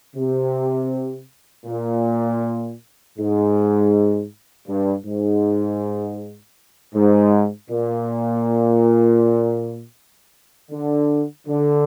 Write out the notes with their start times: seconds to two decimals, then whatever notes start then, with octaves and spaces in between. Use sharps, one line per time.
0.16 C3
1.66 A#2
3.18 G#2
4.68 G2
5.05 G#2
6.94 G#2
7.70 A#2
10.71 D3
11.48 D3